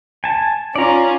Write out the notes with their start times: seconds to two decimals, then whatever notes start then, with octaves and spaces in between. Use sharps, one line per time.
0.24 G#5 A5
0.76 C#4 F4 D5 A#5